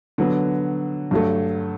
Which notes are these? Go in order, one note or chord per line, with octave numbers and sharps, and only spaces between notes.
D3 F#3 B3
G2 F#3 A3